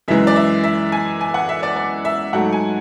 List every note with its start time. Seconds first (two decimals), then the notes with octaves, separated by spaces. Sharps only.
0.08 F#2 E3 G#3 E5
0.27 D5
0.36 E5
0.64 E5
0.92 G#5
1.21 G#5
1.34 F#5
1.49 E5
1.63 D5
1.76 D5
2.05 E5
2.33 G#2 F#3 A3 F#5
2.53 G#5